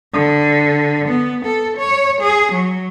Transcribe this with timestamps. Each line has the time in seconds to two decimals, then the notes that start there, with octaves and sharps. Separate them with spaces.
0.14 D3
1.08 B3
1.45 A4
1.77 C#5
2.21 G#4
2.53 F#3